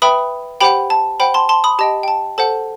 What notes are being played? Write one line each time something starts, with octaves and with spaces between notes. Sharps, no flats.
B4 E5 G5 B5 D#6
G4 C5 F#5 G5 B5
A5
C5 F#5 G5 B5
A5 C6
A5 C6
B5 D#6
G4 D#5 G5 A5
G5
A5
A4 C5 F#5 A5